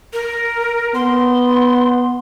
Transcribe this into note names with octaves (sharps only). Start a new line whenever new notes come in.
A#4
B3 C6